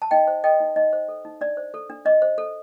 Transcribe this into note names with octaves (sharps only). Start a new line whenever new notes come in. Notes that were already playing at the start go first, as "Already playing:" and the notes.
A5
D#4 D#5 G5
C5
A4 D#5 G5
D#4
D#4 D#5
C5
A4
D#4
D4 D5
C5
A4
D4
D4 D#5
C5
A4